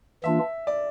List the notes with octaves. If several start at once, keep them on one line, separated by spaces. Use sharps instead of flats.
E3 A#3 D4 F4 E5
D5